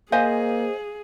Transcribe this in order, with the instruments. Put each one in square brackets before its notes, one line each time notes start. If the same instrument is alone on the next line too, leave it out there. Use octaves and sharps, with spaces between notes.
[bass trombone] A#3 [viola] G#4 [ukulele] C5 D#5 G#5 [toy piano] F5